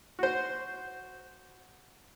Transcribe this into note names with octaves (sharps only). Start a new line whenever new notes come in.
F#4 C5